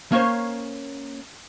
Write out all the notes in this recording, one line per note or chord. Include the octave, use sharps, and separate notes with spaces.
A#3 C#4 C5 C#5